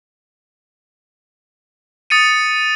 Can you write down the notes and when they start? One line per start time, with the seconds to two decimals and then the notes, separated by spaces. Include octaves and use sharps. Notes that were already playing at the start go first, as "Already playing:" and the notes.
2.10 D#6 A6 C#7 D#7